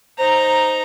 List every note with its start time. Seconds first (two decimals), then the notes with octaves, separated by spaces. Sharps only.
0.18 D#4 C5 A#5